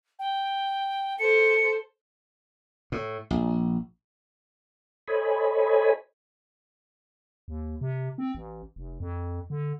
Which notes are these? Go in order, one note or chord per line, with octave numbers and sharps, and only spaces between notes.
G5
A4 C5 C#7
A2
A#1
A4 C5 C#5 D#5 G#5 B5
D#2
C3
C4
A1
F1
F2
D3